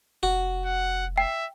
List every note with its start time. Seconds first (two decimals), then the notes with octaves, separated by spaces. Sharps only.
0.23 F1 F#4
0.65 F#5
1.18 E5 G5